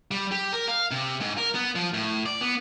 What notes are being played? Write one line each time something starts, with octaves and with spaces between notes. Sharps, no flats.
G3
G4
A#4
F5
C3
G#2
A#4
B3
F3
A2
D5
B3